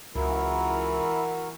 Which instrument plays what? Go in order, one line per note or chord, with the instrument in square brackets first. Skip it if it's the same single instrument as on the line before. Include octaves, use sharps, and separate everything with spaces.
[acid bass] C#2 [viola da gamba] E3 [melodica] E4 [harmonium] F#4 A#4